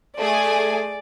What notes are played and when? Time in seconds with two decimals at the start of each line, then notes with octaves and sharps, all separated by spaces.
0.18 A3 G#4 D5 G#5